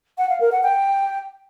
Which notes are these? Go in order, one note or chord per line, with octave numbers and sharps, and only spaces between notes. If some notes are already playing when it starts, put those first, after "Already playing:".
F#5
F5
A#4
F#5
G5